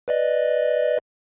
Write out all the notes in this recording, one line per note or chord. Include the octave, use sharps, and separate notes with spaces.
B4 D5 D#5